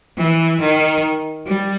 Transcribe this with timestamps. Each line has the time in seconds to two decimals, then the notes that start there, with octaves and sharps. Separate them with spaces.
0.18 E3
0.61 D#3
1.47 G3